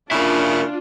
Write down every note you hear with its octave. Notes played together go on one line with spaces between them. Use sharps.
C#3 A#3 D4 E4 F4